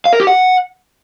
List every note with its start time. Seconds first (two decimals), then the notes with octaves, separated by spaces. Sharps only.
0.05 F5
0.13 A#4
0.20 G4
0.27 F#5